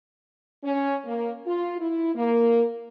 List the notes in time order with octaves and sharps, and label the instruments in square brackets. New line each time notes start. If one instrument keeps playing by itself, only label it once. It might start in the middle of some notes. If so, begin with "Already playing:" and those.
[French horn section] C#4
A#3
F4
E4
A#3